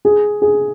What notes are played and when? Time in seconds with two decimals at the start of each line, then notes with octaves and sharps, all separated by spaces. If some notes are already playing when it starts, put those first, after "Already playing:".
0.05 G#4
0.42 G#4